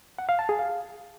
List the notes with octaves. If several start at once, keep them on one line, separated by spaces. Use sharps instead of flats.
F#5
F5
A5
G#4
F5